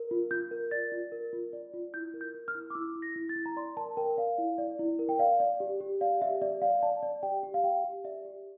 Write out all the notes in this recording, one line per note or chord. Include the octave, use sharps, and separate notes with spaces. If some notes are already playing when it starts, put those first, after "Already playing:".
Already playing: A#4
F4
F4 G6
A#4
D5 A6
F4
A#4
F4
D5
F4
E4 G6
A#4
G6
A#4
F6
E4
D6
E4 E6
E4
A#6
E4
A6
E4
A#5
D5 C6
A#4 A5
A#4 G5
D5 F5
E4
D5
E4
A#4
G5
D5 F5
D5
G4
G4
D5 F5
G4 E5
D5 E5
D5 F5
D5 A5
D5
G4 G5
G4
F5
G4 G5
G4
D5 E5
G4